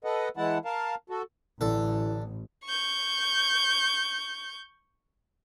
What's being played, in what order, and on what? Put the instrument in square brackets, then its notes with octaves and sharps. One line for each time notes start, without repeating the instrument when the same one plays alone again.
[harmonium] A4 B4 D#5 F#5
E3 G#3 E4 F#5 A5
A#4 F5 A5
F#4 A4
[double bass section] A1 [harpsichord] D3 A4 [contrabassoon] E3
[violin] C#6 G6